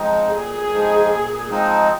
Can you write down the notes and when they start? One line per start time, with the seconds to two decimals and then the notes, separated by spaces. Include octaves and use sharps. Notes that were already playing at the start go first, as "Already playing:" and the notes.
Already playing: F3 G#3 C4 D#4
0.32 A#2 G#4
0.71 F3 G#3 C4 D#4
1.10 A#2
1.49 F3 G#3 C4 D#4